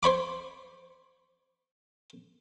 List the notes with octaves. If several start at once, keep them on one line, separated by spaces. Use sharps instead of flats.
C5 C#5 B5 D6